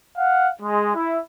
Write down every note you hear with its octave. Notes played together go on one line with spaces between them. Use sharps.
F5 F#5
G#3
E4